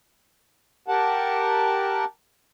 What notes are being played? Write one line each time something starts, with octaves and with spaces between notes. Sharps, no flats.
G4 A#4 F#5 A5